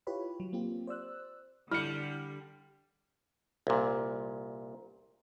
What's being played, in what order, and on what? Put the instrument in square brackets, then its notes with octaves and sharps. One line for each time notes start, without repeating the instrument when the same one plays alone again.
[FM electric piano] E4 F4 G4 B4 C#5 B5
F#3
A#3 C4 F4 G4
C5 D5 E6 F#6
[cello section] D3 [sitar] G3 [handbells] E4 [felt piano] F6 C#7
[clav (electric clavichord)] C2 A#2